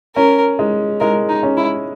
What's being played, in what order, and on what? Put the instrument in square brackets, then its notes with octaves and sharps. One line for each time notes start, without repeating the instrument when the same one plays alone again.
[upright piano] C#4 [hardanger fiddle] A#4
[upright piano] G#3
[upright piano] G#3 [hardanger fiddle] A#4
[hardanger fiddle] D#4
[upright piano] C#4
[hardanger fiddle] E4